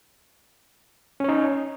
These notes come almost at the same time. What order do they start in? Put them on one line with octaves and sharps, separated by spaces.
C#4 C#5 D#4